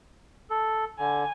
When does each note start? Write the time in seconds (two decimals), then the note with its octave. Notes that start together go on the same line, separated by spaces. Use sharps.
0.50 A4
0.99 D3 G#5